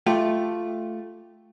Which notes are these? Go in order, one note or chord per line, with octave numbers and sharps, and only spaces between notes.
A3 F4 G4